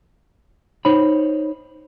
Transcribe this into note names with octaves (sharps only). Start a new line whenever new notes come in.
D#4 C5 C#5 B5